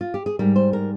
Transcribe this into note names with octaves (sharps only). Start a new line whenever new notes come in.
F4
G4
G#4
G#2 G3 A#4
C5
A#4